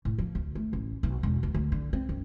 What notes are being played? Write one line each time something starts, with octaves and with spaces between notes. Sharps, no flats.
A2
F3
D2
A3
A1
B1
E1
D2
D2
D3
C4
F#2